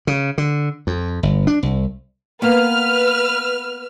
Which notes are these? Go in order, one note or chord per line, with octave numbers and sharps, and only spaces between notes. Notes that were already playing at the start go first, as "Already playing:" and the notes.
C#3
D3
F2
G1
D4
C2
A#3 B3 B4 F6